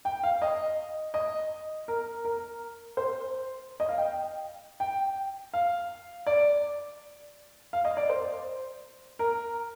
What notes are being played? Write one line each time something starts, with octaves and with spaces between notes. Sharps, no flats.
G5
F5
D#5
D#5
A#4
A#4
C5
D#5
F5
G5
G5
F5
D5
F5
D#5
D5
C5
A#4